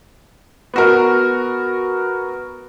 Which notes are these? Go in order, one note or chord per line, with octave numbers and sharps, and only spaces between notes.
B3 F#4 A#4